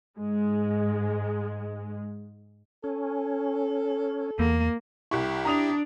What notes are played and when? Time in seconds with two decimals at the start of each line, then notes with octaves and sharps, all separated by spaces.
0.17 G#2 G#3
2.84 C#4 A4
4.39 E2 A#3
5.11 C2 E4 G4 C#6
5.45 D4 A#5 D#6 F7